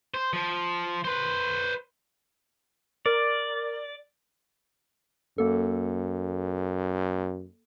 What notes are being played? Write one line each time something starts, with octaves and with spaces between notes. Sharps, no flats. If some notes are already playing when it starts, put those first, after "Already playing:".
C5
F3
B4 C5
A#4 D5
F#2 A#3 A4